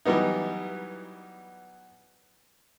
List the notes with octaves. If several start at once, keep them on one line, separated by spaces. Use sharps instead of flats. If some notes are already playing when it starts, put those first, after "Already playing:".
E3 F#3 G3 B3 D#4